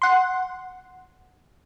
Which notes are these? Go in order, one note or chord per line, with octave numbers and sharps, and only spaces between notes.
F#5 C6